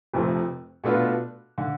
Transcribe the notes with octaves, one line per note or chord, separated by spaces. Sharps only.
F1 F2 C3 F3 A3
B2 A3 D4 F4 B4
D3